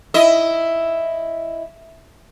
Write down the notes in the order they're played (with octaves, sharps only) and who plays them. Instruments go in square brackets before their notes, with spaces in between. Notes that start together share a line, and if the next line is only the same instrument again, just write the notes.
[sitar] E4 D#5